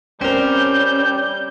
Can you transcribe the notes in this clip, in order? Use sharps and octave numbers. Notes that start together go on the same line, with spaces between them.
G3 C4 C#4 A#4 G6